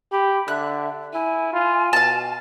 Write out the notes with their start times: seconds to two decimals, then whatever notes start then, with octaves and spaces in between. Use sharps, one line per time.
0.12 G4 B5
0.48 D3 E5 F#6
1.14 E4 G#5
1.53 F4
1.93 B2 F5 A5